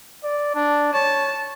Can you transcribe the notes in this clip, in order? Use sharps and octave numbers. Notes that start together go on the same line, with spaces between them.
D5
D4
C#5 A5